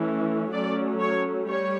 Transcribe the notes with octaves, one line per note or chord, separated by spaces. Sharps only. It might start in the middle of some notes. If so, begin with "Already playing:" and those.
Already playing: E3 A3 C#4
F#3 A3 C#4 D5
C#5
G3 C#5